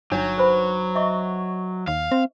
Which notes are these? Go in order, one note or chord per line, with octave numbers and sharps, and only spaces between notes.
G1 F#3 D4 D#4 C#5
B4 C5 B5
D#5 E5 C#6
D#2 F5
C4